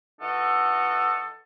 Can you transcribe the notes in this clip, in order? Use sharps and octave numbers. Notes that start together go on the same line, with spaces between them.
E3 D#4 F#4 A4